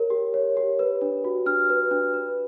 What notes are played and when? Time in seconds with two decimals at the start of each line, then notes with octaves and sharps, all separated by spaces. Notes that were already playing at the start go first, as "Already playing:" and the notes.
Already playing: G4 A#4 C#5
0.10 G4
0.34 C#5
0.57 G4
0.79 B4
1.01 D4
1.24 F#4
1.46 D4 F6
1.70 B4
1.91 D4
2.14 B4